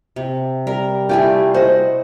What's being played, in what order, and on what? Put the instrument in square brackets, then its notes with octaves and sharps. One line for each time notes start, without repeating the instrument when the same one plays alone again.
[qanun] C3
[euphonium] G3 [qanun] A#4
[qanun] A3 E4 F4 [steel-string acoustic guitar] G4 G5 G#5
[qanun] F#4 [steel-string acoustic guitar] C5 D#5